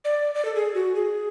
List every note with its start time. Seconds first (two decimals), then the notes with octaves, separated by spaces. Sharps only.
0.05 D5
0.35 D5
0.45 A4
0.55 G#4
0.75 F#4
0.95 G#4